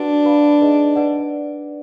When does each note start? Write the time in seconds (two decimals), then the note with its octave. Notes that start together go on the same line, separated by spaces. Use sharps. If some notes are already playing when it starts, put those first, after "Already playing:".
Already playing: D4 F#4 B4 D5 F#5
0.25 B4 F5 B5
0.61 D#4 G#4 B4 D#5
0.96 B4 D5 F#5